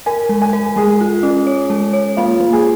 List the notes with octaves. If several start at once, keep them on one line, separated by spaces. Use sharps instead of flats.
A#4 G#5
G#3
G#5
A#4
G#3 G#4
F4
C#4
C#5
G#3
C#5
A#3 F4
A#3
G#4